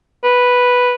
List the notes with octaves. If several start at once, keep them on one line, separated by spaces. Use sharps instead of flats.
B4